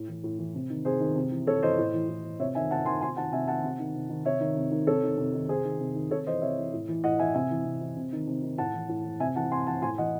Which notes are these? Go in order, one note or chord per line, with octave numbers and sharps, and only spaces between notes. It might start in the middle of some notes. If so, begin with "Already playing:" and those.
Already playing: A2
E3
A2
E3
C3
D#3
C3 G#4 C5
D#3
C3
E3
C3 A4 C#5
E3 C5 D#5
A2
E3
A2
E3
C3 C#5 E5
D#3 E5 G#5
C3 F#5 A5
D#3 G#5 C6
C3 G#5 C6
D#3 F#5 A5
C3 E5 G#5
D#3 F#5 A5
C3
D#3
C3
D#3
C3 C#5 E5
D#3
C3
D#3
C3 A4 C#5
D#3
C3
D#3
C3 G#4 C5
D#3
C3
D#3
C3 A4 C#5
E3 C5 D#5
C3 C#5 E5
E3
A2
E3
A2 D#5 F#5
E3 E5 G#5
C3 E5 G#5
E3
C3
E3
C3
D#3
C3
D#3
A2 F#5 A5
E3
A2
E3
C3 E5 G#5
E3 F#5 A5
C3 G#5 C6
E3 F#5 A5
A2 G#5 C6
E3 D#5 F#5